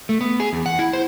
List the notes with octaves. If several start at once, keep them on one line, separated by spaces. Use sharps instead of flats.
A3
B3
G#4
E2
F#5
E4
C5